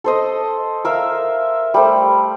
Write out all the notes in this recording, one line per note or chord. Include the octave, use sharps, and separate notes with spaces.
A4 C5 D#5
A#4 E5 F5
G3 A3 C5